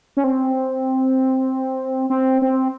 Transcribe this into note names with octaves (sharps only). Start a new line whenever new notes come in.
C#4
C4
C4
C4